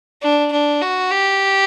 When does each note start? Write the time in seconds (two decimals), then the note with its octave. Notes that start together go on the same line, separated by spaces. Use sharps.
0.22 D4
0.52 D4
0.82 F#4
1.11 G4